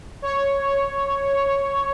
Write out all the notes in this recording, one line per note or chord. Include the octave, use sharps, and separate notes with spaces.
C#5